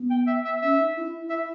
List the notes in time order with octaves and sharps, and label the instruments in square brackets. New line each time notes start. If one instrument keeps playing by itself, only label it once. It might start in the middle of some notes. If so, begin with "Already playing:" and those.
Already playing: [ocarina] B3
[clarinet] G5
E5
E5
[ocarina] C#4 [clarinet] E5
[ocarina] D#4
E4
[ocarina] E4 [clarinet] E5